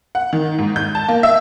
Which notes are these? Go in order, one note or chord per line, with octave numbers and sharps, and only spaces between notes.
F#5
D#3
G#2
G6
A5
A#3
E5